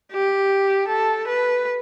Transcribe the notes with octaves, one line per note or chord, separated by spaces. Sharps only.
G4
A4
B4